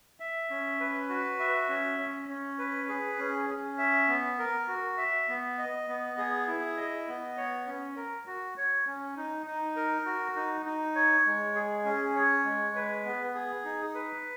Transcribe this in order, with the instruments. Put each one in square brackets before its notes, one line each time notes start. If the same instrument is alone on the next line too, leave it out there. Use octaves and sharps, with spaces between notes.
[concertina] E5
C#4
B4
F#4
E5
C#4
C#4
C#4
B4
G#4
C#4
C#4
E5
B3
A#4
F#4
E5
B3
D#5
B3
G#4
E4
D#5
B3
C#5
C#4
A#4
F#4
C#5
C#4
D#4
D#4
A#4
F#4
D#4
D#4
C#5
G#3
G#4
C#4
C#5
G#3
B4
B3
G#4
D#4
B4